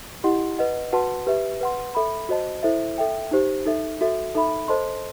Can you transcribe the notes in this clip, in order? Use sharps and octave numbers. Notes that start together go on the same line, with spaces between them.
E4 G4 D#5 F#5 C6
B4 D#5 F#5
F#4 B4 F#5 A5 C6
G4 B4 E5
B4 F#5 C6
A4 E5 B5
F#4 C5 D#5 A5
E4 A4 C5 E5
A4 E5 G5
D#4 G4 C5
D#4 A4 E5
F#4 A4 E5
D#4 A4 E5 B5
A4 C5 D#5 A5 C6